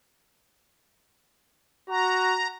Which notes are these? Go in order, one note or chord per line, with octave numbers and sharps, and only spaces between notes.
F#4 A#5